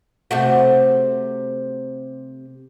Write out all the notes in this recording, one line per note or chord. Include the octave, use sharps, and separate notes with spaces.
C3 A3 F#4